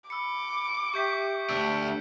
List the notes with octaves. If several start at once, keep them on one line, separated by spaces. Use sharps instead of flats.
B5 D6 E6 C#7
G4 E5 G5 C#6 G6 B6
D2 D4 E6